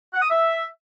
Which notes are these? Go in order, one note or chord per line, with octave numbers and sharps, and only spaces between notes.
F#5
D#6
E5